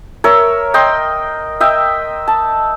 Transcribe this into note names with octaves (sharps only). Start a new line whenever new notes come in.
A#4 C#5 E5
D#5 G5 C6
D#5 E5 G5
A5